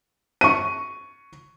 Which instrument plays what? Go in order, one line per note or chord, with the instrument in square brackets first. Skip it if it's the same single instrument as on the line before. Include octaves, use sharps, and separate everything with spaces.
[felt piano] C#6 D#7